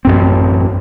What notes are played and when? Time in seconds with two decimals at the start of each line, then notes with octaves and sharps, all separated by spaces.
0.05 A1 F#2 C4